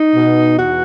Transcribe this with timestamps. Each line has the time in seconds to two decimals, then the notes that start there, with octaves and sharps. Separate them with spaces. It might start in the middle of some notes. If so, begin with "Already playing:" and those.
Already playing: D#4
0.15 B2
0.57 E2 F#4